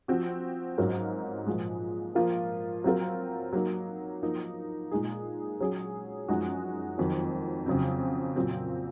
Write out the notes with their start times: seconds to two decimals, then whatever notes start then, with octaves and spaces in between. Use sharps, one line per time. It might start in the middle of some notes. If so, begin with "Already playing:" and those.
0.08 F3 C4 F#4
0.78 G#2 F#3 C#4 F4 A#4
1.47 A#2 F3 G#3
2.15 F3 A#3 F4 A#4
2.84 F#3 C4 F4 A#4
3.53 F#3 A#3 D#4
4.23 F3 A#3 D#4
4.91 A#2 G#3 D#4 G#4
5.61 F#3 C#4 G#4
6.28 F#2 F3 G#3 D#4 F#4
6.98 F2 D#3 F#3
7.66 F2 C#3 F#3 C4
8.36 A#2 F#3 C4